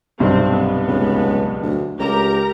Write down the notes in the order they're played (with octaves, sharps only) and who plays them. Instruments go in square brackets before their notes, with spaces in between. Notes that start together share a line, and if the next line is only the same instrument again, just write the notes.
[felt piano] B1 G2 C3 [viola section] C4
[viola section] B3
[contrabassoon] C#2
D2
[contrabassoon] C#2 [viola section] G4 A#4 A#5